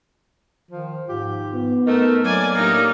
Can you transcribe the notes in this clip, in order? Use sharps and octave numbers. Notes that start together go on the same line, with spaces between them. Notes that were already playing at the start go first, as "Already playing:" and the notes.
D#3 F3
G#2 F3 F4 G4
B3
A3 D#4 A#4
F#3 A#3 D5 G#5
A2 A#3 D4 D#4 G4